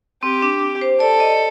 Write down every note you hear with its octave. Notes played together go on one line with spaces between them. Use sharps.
C4 G4
D4
C5
A4 D5
D#5